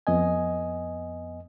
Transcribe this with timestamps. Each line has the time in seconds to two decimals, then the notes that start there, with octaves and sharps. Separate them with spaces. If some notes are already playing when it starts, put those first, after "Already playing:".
0.07 F2 B3 D#5 G#5